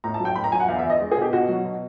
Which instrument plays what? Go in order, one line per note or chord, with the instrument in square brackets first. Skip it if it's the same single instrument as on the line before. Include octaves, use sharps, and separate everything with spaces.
[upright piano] A2 A#5
A5
F#3
G5
A2 B5
A#5
F#3 G#5
F#5
E2 F5
E5
E2
D#5
G#3
G#4
B2 G4
B2 F#4
F#3
B2